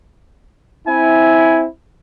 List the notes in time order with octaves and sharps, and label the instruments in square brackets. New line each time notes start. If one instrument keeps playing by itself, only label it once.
[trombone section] C4 E4 [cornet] G#5